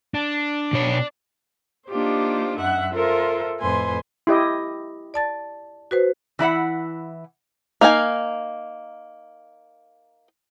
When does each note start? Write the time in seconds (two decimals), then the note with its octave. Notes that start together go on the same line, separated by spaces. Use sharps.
0.14 D4
0.73 B2 C#5
1.89 A#3 D4 D#4 F4 G4 C5
2.58 F#2 E5 F#5 F#6
2.92 F4 A4 A#4 C5 E5
3.61 F2 A2 B4 C5 G#5 C6
4.27 E4 G4 D#5
5.14 D5 A5 A6
5.91 F#4 B4 C5
6.39 E3 E4 E5 F#5
7.81 A#3 D#4 F5 G#5